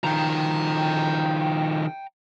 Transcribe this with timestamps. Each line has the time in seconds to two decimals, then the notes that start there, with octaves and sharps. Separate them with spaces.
0.04 D#3 F3 G5 A#5